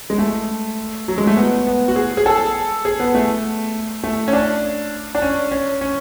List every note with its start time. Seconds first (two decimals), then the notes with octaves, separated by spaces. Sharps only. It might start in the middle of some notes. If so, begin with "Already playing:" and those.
0.10 G#3
0.18 A3
1.08 F#3
1.18 G#3
1.27 A3
1.37 B3
1.67 B3
1.88 F#4
1.96 G#4
2.17 G#4
2.26 A4
2.85 G#4
3.00 B3
3.15 A3
4.03 A3
4.28 C#4
4.33 D4
5.15 D4
5.22 C#4
5.51 C#4
5.81 C#4